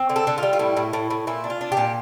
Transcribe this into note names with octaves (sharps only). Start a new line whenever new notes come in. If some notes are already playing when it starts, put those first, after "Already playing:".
Already playing: C4
D3
A4
D3
G3 F4
F4
A2 E4
A2
A2
A2
A#2 E4
D4
F4
D4
G4
A#2